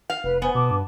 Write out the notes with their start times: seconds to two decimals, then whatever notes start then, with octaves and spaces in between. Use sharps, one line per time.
0.10 F5
0.24 F1 B4
0.42 B3 C5 G#5
0.55 B2 A5 D6
0.70 G2